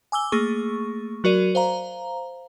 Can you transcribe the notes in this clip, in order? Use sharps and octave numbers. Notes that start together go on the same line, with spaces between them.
G#5 D6 E6 G7
A3 A#3 G#4 C#6
F#3 F#4 A#4 D5 D#7
C5 F5 A#5